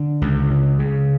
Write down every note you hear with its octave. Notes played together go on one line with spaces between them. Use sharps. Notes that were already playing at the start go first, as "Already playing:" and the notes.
Already playing: D3
C#2
C#3
C#3